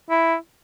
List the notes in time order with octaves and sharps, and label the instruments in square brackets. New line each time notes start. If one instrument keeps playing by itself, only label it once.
[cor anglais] E4